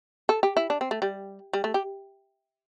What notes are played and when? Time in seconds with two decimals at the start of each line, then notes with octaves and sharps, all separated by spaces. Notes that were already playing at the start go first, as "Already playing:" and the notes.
0.29 A4
0.43 G4
0.57 E4
0.70 D4
0.81 C4
0.91 A3
1.02 G3
1.53 G3
1.64 A3
1.74 G4